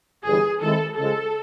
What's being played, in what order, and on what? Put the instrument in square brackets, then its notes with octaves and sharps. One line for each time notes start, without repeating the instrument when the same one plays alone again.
[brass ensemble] G1 G2 E3 [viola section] G#4
[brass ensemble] D#3 G#3 C4 E4 [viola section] A4
[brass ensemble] C#3 F3 G#3 [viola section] A4